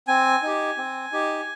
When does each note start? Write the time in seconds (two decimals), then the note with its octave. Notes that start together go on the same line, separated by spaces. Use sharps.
0.08 C4 G#5
0.43 D#4 G4
0.78 C4
1.12 D#4 G4